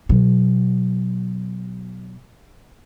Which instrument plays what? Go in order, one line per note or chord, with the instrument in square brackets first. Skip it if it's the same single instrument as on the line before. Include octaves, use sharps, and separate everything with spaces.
[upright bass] B2 F#3